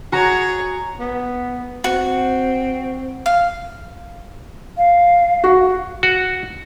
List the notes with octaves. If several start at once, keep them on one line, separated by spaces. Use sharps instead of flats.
F#4 G#4 C#5 A#5
B3
C4 F#4
F5
F5
F#4
F#4